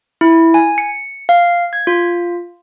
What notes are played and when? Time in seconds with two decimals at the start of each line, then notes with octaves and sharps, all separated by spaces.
0.21 E4
0.54 G#5
0.78 C#7
1.29 F5
1.73 G#6
1.87 F4